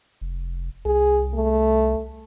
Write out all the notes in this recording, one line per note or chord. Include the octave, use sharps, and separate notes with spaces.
F1
C2 G#4
A3